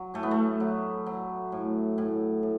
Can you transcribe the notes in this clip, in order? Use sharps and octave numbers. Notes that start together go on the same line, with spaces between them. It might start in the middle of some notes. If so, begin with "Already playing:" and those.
Already playing: F#3
A2 A3
B3
A3
F#3
F#3
A2
A2
A2